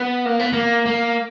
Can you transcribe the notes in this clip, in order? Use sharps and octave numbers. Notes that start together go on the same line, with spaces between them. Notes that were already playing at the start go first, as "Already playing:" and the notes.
Already playing: B3
A#3
B3
A#3
A#3